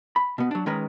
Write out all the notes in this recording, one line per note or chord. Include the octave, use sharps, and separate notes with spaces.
B5
B2 B3
F#3 D4
D#3 G#3 C#4 B4 A#5